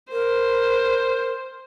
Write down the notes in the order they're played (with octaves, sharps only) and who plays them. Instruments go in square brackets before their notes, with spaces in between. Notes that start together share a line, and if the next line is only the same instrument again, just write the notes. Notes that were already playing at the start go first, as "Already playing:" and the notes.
[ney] A#4 [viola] C5